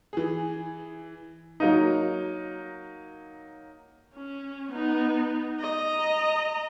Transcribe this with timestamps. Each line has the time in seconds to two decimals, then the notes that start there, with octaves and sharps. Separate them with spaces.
0.13 E3 G#4
1.60 F#3 A#3 D#4
4.16 C#4
4.72 B3 D#4
5.60 D#5 A#5